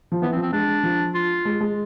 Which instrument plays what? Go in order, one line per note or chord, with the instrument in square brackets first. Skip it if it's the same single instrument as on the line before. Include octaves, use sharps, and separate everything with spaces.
[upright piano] F3
[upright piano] E3 [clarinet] B3
[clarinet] C4
[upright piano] F3
[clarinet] C4
[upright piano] G#3 [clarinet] D4
[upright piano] F3
[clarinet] F4
[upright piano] G#3
G#3